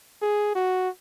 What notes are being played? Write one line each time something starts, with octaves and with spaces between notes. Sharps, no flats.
G#4
F#4